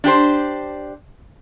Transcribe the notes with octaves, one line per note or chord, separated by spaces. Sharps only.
D4 G4 C5